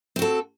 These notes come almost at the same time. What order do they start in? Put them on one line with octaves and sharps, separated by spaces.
C4 F#4 A4